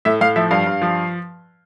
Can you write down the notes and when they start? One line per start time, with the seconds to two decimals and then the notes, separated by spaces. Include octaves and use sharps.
0.05 A2 E5
0.21 A2 F5
0.36 F3 E5
0.51 G2 F5
0.67 G2
0.82 F3